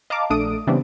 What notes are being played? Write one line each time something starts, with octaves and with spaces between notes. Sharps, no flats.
D#5 F5 A5 A#5 D6
A#1 A3 D4 A4 D#6 D7
C#3 E3 G3 B3 C4 D4